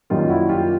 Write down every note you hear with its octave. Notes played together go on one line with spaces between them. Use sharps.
F#2 D#3 G3 A#3 D#4 F4
E4 F#4
F4 G4